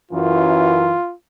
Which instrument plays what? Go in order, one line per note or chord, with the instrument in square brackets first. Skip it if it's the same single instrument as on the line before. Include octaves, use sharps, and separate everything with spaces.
[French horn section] F#2 E3 [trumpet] F4